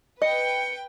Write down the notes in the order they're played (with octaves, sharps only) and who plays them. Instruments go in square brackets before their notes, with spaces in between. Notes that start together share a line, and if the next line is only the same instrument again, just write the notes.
[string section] B4 G5 [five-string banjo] D#5 [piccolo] C#7